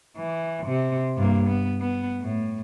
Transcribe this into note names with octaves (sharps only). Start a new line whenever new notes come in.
E3
C3
G2 A#3
B3
B3
A2